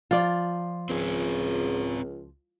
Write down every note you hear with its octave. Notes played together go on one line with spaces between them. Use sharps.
F3 F4 D5
C#2 C4 G#4